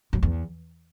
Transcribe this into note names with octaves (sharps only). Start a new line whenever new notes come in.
F#2
E2